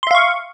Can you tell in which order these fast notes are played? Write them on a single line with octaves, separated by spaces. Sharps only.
C6 E5 F5 C#6